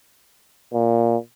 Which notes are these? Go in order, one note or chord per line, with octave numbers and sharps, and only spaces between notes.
A#2